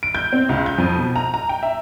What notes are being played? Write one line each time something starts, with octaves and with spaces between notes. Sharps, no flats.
D7
G6
C4
C#2
G6
F2
B2
A#5
A#5
G5
E5